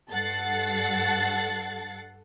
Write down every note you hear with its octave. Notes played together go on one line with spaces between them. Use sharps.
G2 A4 F#5 A6 C7